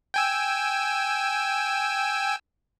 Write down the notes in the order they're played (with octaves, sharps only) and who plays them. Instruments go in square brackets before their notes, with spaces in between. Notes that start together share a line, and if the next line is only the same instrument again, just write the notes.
[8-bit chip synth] G5 G#5 E6